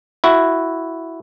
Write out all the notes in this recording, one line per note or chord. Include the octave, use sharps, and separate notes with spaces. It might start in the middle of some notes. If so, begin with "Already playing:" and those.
E4 F#4